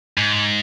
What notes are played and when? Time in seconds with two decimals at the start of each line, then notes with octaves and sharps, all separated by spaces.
0.18 G#2